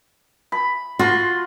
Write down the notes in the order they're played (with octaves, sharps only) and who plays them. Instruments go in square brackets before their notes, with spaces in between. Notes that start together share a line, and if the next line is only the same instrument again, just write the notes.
[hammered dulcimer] B5
[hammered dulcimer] F4 C6 [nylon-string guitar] F#4